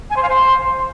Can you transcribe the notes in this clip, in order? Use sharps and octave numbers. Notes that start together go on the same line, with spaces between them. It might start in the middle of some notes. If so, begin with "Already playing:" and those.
G#5
C5
F5
C5